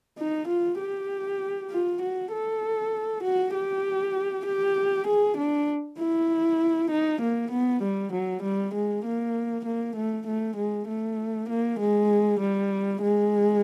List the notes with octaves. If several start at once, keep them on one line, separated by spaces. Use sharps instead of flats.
D#4
F4
G4
F4
F#4
A4
F#4
G4
G4
G#4
D4
E4
D#4
A#3
B3
G3
F#3
G3
G#3
A#3
A#3
A3
A3
G#3
A3
A#3
G#3
G3
G#3